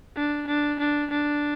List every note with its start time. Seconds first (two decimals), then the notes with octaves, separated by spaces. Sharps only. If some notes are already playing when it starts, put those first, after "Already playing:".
0.16 D4
0.47 D4
0.79 D4
1.10 D4